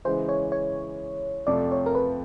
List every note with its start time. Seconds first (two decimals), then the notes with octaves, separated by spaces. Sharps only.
0.05 C#3 E3 G#3 C5
0.29 C#5
0.52 C#5
1.47 F2 C3 F3 A3 D5
1.72 C#5
1.86 A#4
1.95 B4